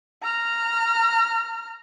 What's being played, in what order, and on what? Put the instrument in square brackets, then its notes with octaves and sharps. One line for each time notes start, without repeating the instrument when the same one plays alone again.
[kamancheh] A#5 F6